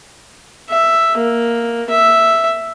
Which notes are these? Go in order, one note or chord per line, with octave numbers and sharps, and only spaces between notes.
E5
A#3
E5